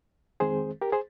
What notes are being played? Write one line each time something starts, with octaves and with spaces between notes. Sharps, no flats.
F2 D#3 G#3 C4 G#4 C5
G4 A#4
G#4 C5